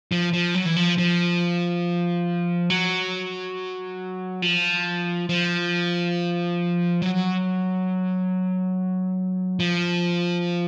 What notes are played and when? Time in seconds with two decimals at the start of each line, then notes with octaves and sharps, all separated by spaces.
0.12 F3
0.33 F3
0.55 F#3
0.65 E3
0.76 F3
0.98 F3
2.70 F#3
4.42 F3
5.29 F3
7.02 F#3
9.60 F3